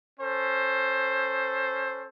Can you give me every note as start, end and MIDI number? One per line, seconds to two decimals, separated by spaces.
0.20 2.08 61
0.20 2.08 69
0.20 2.08 72